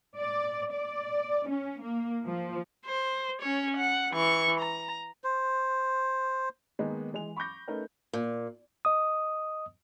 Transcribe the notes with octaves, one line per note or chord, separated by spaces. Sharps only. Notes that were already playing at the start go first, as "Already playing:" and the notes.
D5
D5
C#4
A#3
F3
C5
C#4 C#5
F#5
E3 C#6
A#5
C5
D#3 G#3 A#3 B3 D#4
E3 G#3 F7
B5 C#6 D6 G6 A#6
A3 C#4 D#4 A#4 B4
A#2
D#5 D#6